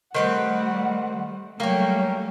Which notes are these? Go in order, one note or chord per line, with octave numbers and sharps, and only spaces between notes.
D#3 G3 A3 C4 B4 F#5
F#3 G3 A3 A#3 C#4 C#5 G5